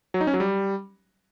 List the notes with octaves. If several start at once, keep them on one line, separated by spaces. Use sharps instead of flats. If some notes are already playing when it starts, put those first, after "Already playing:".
F#3
D#4
C#4
F#3
G3